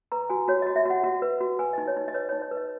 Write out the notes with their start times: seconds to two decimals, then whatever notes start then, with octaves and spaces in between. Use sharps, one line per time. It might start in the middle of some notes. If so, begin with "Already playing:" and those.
0.12 B4 A#5
0.29 F#4 G#5
0.48 F#4 C#5
0.62 F#4 D#5
0.76 E5
0.85 F#4 F#5
1.04 F#4
1.22 B4
1.41 F#4
1.59 B4 G#5
1.73 D#4 D#5
1.87 C#5
1.97 D#4
2.08 D#5
2.14 B4 C#5
2.29 D#4 C#5
2.42 C#5
2.51 B4
2.57 D#5